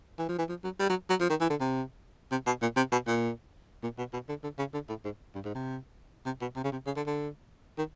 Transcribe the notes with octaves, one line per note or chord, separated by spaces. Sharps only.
E3
F3
E3
F3
F#3
G3
F#3
F#3
F3
D#3
E3
D3
C3
C3
B2
A#2
C3
B2
A#2
A#2
B2
B2
D3
D3
C#3
D3
A2
G#2
G2
G#2
C3
C3
B2
C3
C#3
C3
C#3
D3
D3
D#3